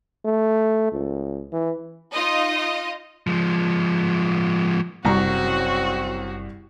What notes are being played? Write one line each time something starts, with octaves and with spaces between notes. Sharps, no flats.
A3
C#2
E3
D#4 F4 D#5
F3 G#3
F#1 C2 C#3 F#3 C4 F#4 A#5 C#6